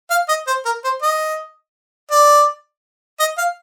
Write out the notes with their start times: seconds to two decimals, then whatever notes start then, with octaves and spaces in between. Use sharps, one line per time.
0.10 F5
0.28 D#5
0.47 C5
0.65 A#4
0.84 C5
1.02 D#5
2.11 D5
3.20 D#5
3.38 F5